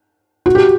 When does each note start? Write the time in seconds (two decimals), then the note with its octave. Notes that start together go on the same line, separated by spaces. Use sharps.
0.46 F#4
0.55 G4